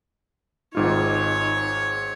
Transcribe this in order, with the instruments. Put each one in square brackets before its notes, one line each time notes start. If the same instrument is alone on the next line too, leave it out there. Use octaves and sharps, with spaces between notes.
[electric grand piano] G#1 G#2 F4 [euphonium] D#4 [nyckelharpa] C#5